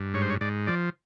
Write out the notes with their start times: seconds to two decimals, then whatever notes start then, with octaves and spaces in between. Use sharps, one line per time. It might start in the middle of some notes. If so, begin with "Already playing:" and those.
Already playing: G2
0.14 G#2 C#5
0.22 C5
0.30 C#5
0.41 G#2 D5
0.67 F3 D5